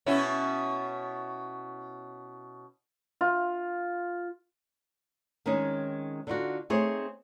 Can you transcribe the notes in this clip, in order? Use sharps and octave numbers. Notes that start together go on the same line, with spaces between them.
B2 C#4 E4
F4
D#3 G#3 C4 C#4 D#4
D3 D#4 F4 F#4
A3 C4 D#4 G#4 C5 C#5